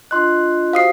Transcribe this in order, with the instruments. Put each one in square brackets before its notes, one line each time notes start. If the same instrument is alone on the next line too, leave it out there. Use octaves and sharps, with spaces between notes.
[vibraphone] D4 F4 D#5 [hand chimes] C6 F#6
[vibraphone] F#4 G4 C5 [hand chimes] F5 D#6 C7